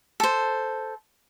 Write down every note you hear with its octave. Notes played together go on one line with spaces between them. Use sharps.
A4 C5